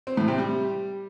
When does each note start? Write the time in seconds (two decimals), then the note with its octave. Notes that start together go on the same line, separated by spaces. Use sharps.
0.07 C4
0.17 A2
0.28 C3
0.38 G3